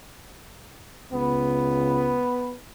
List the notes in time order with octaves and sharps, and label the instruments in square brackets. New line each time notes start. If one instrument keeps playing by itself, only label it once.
[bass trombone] C#2 [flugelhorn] B3